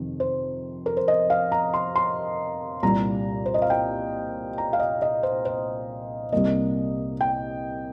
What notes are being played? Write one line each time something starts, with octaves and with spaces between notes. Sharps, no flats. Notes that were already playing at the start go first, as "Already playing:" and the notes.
Already playing: F2 C3 D#3
C5
A#4
C5
D#5
F5
A#5
C6
C6
C2 A#2 G3 A#5
C5
D#5
F5
G5
A#5
F5
D#5
D#5
C5
C5
C2 C3 G3 A#3 D#5
G5